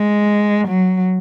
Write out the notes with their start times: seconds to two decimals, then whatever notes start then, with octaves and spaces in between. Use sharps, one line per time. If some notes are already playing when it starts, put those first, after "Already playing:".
Already playing: G#3
0.67 F#3